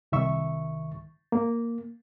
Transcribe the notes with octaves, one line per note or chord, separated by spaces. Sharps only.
C2 D#3 E5 C#6
A#3